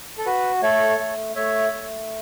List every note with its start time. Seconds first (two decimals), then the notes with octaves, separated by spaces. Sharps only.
0.18 A4
0.26 F#4 B4
0.62 A3 A4 C#5
1.00 A3
1.35 A3 C#5 E5
1.73 A3